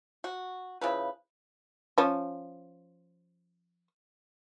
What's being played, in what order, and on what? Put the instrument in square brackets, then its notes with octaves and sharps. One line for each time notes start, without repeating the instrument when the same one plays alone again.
[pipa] F#4
C#3 F3 E4 B4
[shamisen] F3 C#4